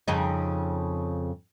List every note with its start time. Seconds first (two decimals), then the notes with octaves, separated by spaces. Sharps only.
0.08 F2 C#3 D#4